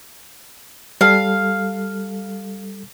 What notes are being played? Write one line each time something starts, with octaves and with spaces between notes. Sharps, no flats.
G3 A4 F5